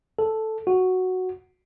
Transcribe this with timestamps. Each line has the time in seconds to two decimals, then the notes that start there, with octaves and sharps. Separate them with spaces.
0.19 A4
0.67 F#4